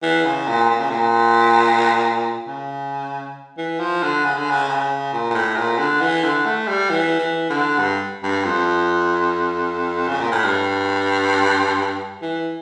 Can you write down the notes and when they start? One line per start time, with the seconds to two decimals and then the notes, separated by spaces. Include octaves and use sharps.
0.03 E3
0.25 C#3
0.48 A#2
0.70 A#2
0.80 C#3
0.90 A#2
2.47 C#3
3.58 E3
3.79 F3
4.03 D3
4.25 C#3
4.38 D3
4.51 C#3
4.69 C#3
5.13 A#2
5.30 A#2
5.34 A2
5.57 A#2
5.79 D3
6.01 E3
6.23 D3
6.46 A3
6.68 G3
6.90 E3
7.19 E3
7.50 D3
7.78 G2
8.23 G2
8.45 F2
10.08 C#3
10.21 A#2
10.32 A2
10.45 G2
12.22 E3